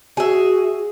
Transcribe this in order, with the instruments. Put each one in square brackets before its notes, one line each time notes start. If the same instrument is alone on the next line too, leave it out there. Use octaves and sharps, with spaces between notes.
[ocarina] F#4 [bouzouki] G#4 E5